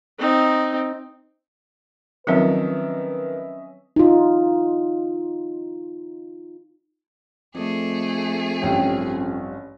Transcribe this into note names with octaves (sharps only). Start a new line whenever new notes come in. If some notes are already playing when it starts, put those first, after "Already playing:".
C4 D#4
D#3 F3 F#3 C4 C#4 B4 D#5 E5
D#4 F4
F2 A3 D4 G#4 D#5
A1 G2 C#4 C#5 G5 A5